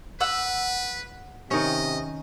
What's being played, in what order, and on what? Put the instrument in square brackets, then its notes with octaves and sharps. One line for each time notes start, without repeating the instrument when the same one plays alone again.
[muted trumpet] B4 [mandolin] F#5 E6
[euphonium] C3 [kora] D#3 C#4 [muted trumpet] D#5